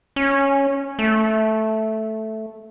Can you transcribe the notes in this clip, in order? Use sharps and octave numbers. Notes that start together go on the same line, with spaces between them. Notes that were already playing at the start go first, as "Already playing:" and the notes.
C#4
A3